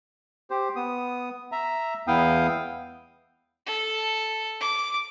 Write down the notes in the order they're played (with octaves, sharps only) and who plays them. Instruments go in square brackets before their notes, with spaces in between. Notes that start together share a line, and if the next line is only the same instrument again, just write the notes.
[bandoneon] G4 C5
B3 D#6
E5 A#5
E2 B3 E4 F5 G5 D#6
[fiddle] A4
D6